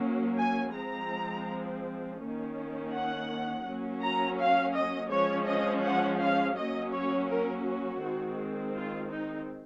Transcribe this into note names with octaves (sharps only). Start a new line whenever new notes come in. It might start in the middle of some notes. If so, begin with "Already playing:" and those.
Already playing: F#3 A#3 C#4
G#5
F3 G#3 C4 A#5
D#3 A#3 C#4
F#5
F#3 A#3 C#4
A#5
F5
D#5
F3 G#3 C#4 C#5
D#5
F#5
F5
F#3 A#3 C#4 D#5
C#5
A#4
F#4
D#3 G#3 C4
F4
D#4